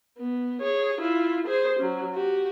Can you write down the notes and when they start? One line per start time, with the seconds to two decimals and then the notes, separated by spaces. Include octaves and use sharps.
0.18 B3
0.61 G#4 C#5
1.01 E4 F4
1.47 G#4 C5
1.79 F#3 C#4
2.13 F#4 G4